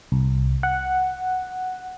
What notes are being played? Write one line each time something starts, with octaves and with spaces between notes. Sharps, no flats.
C2
F#5